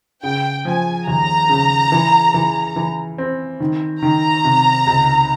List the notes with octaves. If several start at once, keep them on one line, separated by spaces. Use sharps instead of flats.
C#3 G5
F3 G#5
D#2 A#5
C#3
E3
E3
E3
C4
D#3
D#3 A#5
C3
C#2